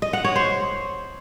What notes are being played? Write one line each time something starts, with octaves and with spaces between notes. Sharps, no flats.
D#5
F#5
C#5
C5